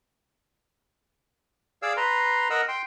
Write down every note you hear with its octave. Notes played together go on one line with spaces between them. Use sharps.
G#4 D5 F5 E6
B4 A#5 C6
A#4 D#5 F#5 E6 F#6
G5 C6